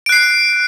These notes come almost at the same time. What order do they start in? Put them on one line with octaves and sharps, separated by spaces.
D7 F#6 C7